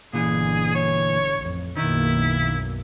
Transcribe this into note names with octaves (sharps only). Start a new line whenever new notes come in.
G1 A#2 D3 E3 G#4
C#5
A1 F2
B1 F#2 D#3 A#3 E4